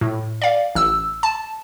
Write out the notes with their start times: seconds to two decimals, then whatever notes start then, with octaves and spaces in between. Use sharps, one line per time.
0.01 A2
0.42 D5 F5
0.75 A1 E6
1.23 A5